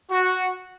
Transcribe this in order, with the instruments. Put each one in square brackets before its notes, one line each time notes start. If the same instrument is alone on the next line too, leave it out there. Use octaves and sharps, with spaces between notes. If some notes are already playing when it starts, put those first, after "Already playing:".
[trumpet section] F#4